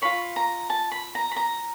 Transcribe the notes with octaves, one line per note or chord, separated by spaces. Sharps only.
F4 G#4 C#5 B5
A#5
A5
B5
A#5
B5
A#5